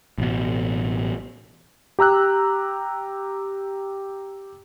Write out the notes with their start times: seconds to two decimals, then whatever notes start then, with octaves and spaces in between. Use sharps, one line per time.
0.18 A1 B2
1.99 G4 A#5 E6 F#6